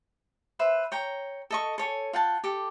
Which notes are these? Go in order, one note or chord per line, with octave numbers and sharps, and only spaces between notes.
B4 C5 E5
C#5 G5 A#5
A4 D#5 C#6
A4 C#5 G#5
F4 F#5 G5 A5
G4 A4